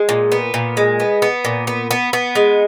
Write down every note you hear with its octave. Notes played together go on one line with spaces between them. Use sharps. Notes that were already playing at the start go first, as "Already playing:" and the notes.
Already playing: G#3
A#2
B3
A#2
G#3
B3
B3
A#2
B3
B3
B3
G#3